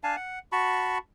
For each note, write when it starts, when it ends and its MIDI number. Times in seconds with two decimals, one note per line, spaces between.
0.04 0.16 62
0.04 0.16 77
0.04 0.16 80
0.04 0.16 81
0.16 0.39 78
0.52 0.98 66
0.52 0.98 81
0.52 0.98 83
0.52 0.98 85